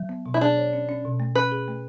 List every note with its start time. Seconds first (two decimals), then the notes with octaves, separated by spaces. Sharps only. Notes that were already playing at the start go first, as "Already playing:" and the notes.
Already playing: F#3
0.09 B3
0.26 B2
0.34 E4
0.41 D4 G#4
0.58 C#5
0.73 C#4
0.89 C#4
1.05 B2
1.20 A3
1.35 C#4 B4
1.52 G#4
1.68 A3